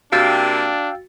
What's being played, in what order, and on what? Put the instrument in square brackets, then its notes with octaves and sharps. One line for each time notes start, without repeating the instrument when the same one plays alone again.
[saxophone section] C3 A#3 [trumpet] D4 [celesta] F#4 A6 [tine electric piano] F5 G5 E6